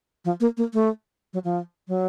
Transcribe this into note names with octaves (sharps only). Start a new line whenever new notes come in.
F3
A#3
A#3
A3
F#3
F3
F#3